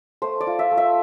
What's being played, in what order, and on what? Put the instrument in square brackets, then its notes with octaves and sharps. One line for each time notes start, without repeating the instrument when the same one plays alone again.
[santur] A3 C5
D5
F4
E5
A3
E5